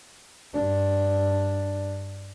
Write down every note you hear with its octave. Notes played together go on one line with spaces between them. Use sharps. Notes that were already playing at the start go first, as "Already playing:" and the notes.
G2 D4